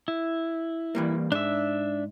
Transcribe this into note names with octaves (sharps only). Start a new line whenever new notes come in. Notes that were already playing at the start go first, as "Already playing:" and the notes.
E4
E3 G3 A#3
G#2 D4 E5